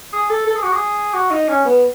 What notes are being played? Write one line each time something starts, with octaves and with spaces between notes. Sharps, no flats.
G#4
A4
A4
G#4
F#4
G#4
F#4
D#4
C#4
B3